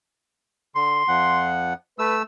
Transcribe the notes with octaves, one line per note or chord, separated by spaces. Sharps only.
D3 C6
F2 F3 F#5
A3 B4 E6